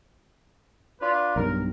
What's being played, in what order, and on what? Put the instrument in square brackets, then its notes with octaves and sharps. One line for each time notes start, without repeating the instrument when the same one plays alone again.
[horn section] D4 F4 B4
[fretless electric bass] B1 G2 [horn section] A#4